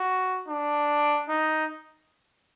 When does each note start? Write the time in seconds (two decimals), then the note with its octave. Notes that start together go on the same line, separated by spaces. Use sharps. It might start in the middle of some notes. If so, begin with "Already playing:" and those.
Already playing: F#4
0.48 D4
1.29 D#4